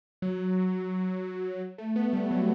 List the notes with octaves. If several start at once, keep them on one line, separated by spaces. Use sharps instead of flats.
F#3
A3
B3
G3
F#3